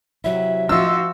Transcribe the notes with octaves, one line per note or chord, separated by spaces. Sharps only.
C3 F#3 E4 E5
F3 D#4 F4 F#4 E6